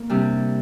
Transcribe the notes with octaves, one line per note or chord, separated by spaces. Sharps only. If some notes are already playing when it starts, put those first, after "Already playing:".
Already playing: A#3
C3 G3 D4